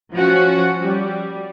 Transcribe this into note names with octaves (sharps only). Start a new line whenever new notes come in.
F3 C#4 F#4
G3